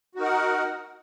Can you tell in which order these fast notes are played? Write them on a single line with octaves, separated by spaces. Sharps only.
F#4 D#4 A#4 F#5